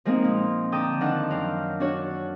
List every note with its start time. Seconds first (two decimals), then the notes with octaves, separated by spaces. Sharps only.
0.05 F3 G#3 A#3 C4 D#4
0.24 A#2
0.72 D3 G5 A5 A#5 D6 D#6
1.01 D#3 F3 D4 F#5
1.30 F#2 F5 G5
1.80 D4 F#4 C#5 F#5